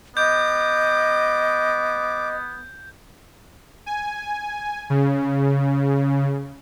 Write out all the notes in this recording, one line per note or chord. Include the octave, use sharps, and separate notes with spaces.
B3 D#5 D6 G6
G#5
C#3